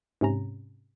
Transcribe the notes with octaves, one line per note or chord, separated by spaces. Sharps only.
G#2 C3 C#4 A#5